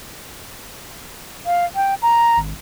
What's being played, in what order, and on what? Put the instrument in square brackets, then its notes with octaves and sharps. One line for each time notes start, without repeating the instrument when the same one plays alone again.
[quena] F5
G5
A#5
[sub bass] G#1